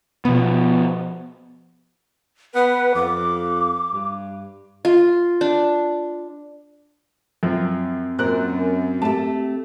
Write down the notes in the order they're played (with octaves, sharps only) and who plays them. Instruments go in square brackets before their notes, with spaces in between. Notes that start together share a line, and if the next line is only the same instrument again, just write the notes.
[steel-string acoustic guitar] B2 [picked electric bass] F3 B3
[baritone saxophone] B3 [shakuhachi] B4
[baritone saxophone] F2 [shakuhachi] D6
[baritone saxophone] G2
[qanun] F4
D4
[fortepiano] F#2 F3 [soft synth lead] C4
[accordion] F#2 [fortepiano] A#2 F#6 [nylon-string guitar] A#4 C5
[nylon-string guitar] A3 G4 [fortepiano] A5